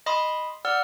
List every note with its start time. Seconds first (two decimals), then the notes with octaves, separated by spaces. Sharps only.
0.06 D#5 B5 C6 D#6
0.65 D5 F#5 E6 F6